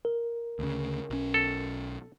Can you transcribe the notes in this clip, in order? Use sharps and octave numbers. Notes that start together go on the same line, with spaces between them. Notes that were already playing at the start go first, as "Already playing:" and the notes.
A#4
D2 C#3
B1 C#4
A4